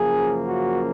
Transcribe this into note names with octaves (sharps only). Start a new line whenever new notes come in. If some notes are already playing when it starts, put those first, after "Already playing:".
Already playing: F#2 C#3 F3 A#3 G#4
F#4